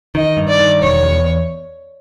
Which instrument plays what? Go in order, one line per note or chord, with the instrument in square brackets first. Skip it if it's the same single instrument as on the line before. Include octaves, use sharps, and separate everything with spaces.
[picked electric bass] D#3 [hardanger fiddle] D#5
[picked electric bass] G2
[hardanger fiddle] D5
[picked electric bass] D#3
[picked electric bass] E1 [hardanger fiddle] C#5
[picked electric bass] E2